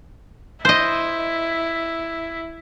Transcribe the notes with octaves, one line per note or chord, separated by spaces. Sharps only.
E4 C5 D#5